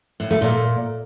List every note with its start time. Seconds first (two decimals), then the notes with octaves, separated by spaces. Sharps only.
0.20 A2
0.31 A3
0.41 A#2